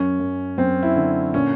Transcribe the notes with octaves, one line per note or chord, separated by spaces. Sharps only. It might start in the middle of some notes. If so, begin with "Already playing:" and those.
Already playing: F#2 C#4
F#2
F#2 C4
E4
D3
A#2 C#4